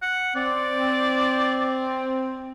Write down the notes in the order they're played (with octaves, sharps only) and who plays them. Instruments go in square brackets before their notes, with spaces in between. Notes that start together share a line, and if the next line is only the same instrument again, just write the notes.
[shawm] F#5
[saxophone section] C4 [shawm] D5